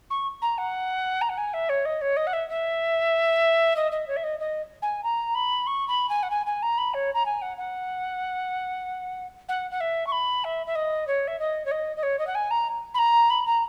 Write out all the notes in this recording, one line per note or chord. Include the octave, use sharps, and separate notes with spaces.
C#6
A#5
F#5
A#5
F#5
G#5
E5
C#5
D#5
C#5
D#5
F#5
E5
E5
D#5
D#5
C#5
E5
D#5
D#5
G#5
A#5
B5
C#6
B5
G#5
F#5
G#5
G#5
A#5
B5
C#5
A#5
G#5
F#5
F#5
F#5
F#5
E5
C#6
B5
E5
E5
D#5
C#5
E5
D#5
C#5
D#5
D#5
C#5
D#5
F#5
G#5
A#5
B5
A#5
B5
A#5